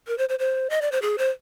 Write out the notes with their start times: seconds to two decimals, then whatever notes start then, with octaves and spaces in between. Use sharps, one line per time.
0.07 A#4
0.18 C5
0.29 C5
0.39 C5
0.70 D#5
0.81 D5
0.92 C5
1.02 G#4
1.18 C5